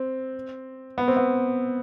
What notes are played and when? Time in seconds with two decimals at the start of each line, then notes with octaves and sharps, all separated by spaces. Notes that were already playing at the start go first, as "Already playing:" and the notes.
Already playing: C4
0.98 B3
1.08 C4
1.17 B3